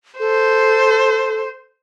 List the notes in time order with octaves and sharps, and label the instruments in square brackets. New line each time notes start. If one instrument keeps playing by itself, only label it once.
[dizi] A4 [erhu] C5